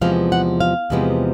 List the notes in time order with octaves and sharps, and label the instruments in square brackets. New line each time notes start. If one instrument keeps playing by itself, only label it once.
[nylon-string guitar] E2 C3 F3 G#3 B3 F5
F#5
F5
E2 C3 F3 G#3 B3